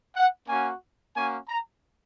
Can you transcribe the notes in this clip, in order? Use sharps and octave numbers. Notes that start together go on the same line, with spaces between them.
F#5
A#3 C#4 F#4 G#5
A#3 C#4 F#4 G#5
A#5